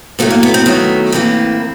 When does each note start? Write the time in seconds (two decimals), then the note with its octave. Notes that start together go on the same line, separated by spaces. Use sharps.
0.19 A2 F#3 A3 B3
0.30 A#3
0.43 B3
0.54 C4
0.66 D#3 F#3 A3 B3
1.12 A2 E3 G3 A#3 C4